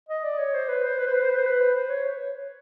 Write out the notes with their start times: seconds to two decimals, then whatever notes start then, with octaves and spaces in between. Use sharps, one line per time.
0.09 D#5
0.24 D5
0.39 C#5
0.54 C5
0.69 B4
0.84 C5
0.99 B4
1.07 C5
1.14 B4
1.22 C5
1.30 B4
1.38 C5
1.46 B4
1.74 C5
1.90 C#5